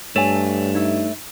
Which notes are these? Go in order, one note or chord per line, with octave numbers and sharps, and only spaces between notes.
G2 A3 A4 C#5 G#5
D#4 C#5 E5